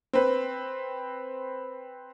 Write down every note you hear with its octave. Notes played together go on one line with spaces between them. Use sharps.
C4 B4